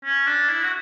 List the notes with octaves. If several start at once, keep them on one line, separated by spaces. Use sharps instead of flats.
C#4
D4
E4
F#4